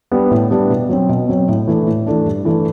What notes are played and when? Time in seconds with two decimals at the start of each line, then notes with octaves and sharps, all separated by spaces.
0.12 G3 B3 D4
0.31 A2
0.51 G3 B3 D4
0.70 B2
0.89 F#3 C4
1.09 B2
1.28 F#3 C4
1.48 A2
1.67 E3 A3 D4
1.87 A2
2.07 E3 A3 D4
2.26 G2
2.45 E3 A3 D4